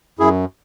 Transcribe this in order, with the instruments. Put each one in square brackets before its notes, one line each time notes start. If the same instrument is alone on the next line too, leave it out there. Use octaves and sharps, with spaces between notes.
[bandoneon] F#2 E4 G#4